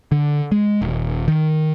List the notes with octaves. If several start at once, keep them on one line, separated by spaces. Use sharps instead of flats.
D3
G#3
D#1
D#3